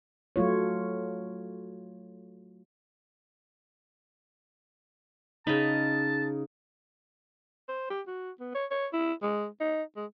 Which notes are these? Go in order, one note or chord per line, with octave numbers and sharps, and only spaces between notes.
F#3 A3 F4 C#5
C#3 D#4 D#5 A5 B5
C5
G4
F#4
B3
C#5
C#5
E4
G#3
D#4
G#3